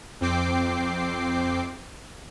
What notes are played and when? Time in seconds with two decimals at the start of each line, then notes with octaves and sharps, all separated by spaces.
0.21 F2 C4 G5 D6 C7